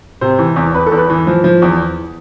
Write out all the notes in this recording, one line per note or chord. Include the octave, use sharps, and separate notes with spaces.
C3 C5
E3
E2
E2 B4
A4
E2
B4
E3
F3
F3
E2